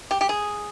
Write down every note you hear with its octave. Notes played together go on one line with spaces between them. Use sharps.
G4
G4
G#4